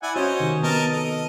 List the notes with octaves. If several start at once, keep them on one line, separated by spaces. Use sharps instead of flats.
E4 D5 F#5 G#5
C#4 F#4 C5 C#5 D#5
C3 D#3
B3 A#4 D#5 A5
A4 D#5